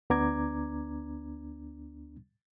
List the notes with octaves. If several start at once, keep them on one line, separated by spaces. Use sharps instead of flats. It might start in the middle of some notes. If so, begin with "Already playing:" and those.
D2 B3 D4 A#5 D6 G#6